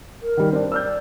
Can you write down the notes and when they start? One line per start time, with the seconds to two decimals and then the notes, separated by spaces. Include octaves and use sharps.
0.22 A#4
0.37 D#3 G3
0.52 C4 D4 A#4
0.72 D5 E6 F6 G6